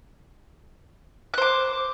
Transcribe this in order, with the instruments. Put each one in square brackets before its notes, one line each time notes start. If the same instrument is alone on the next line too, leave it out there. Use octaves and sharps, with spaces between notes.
[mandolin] F#6
C5
D6